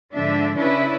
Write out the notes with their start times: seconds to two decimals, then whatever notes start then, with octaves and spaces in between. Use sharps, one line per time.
0.12 G#2 D3 F3 D4 E5
0.56 C#3 C#4 D4 E4 B4